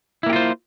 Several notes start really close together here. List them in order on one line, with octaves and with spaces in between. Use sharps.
E4 A#3 G4 F4 C5